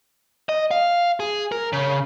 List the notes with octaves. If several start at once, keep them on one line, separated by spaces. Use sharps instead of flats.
D#5
F5
G#4
A#4
C#3